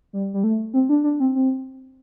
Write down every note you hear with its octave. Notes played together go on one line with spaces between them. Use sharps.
G3
G3
A3
C4
D4
D4
C4
C4